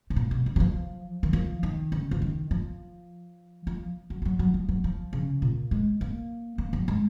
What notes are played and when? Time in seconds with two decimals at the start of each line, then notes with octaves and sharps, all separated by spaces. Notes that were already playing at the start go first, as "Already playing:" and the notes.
0.10 G#2
0.16 A#2
0.31 B2
0.46 C#3
0.56 F#3
0.60 F3
1.23 D#3
1.33 F3
1.63 D#3
1.92 C#3
2.11 F3
2.22 D#3
2.51 F3
3.67 F3
4.10 F#3
4.22 F3
4.25 F#3
4.39 F#3
4.54 F3
4.69 F#3
4.84 F3
5.13 C#3
5.42 A#2
5.71 G#3
6.01 A#3
6.58 A#3
6.73 F#3
6.88 G#3